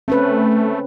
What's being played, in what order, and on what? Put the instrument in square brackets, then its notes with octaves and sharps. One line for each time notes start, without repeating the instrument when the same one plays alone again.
[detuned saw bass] A3 [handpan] C4 C#4 B4